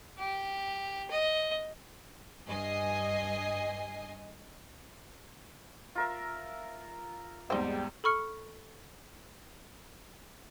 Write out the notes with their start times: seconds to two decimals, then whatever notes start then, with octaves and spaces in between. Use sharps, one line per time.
0.18 G4
1.11 D#5
2.46 G2 D#5 G#5 C7
5.95 F4 A#4 E5
7.50 E2 G#2 G3 C4 D#4
8.04 A4 B5 C#6 F6 C#7